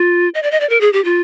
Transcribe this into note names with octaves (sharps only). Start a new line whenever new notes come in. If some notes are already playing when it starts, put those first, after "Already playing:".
Already playing: F4
D#5
D5
D#5
D5
A#4
G#4
G4
F4